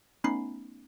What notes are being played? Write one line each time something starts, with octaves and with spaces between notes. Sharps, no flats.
A3 B3 C#4 D#4 B5 C7